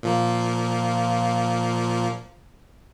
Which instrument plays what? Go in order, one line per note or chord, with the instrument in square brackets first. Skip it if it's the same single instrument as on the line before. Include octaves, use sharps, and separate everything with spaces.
[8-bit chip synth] A#2 F3 A#3